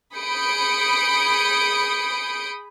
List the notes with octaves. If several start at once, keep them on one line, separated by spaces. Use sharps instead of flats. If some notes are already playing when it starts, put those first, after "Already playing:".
G#4 B5 D#6 G6 C#7 D7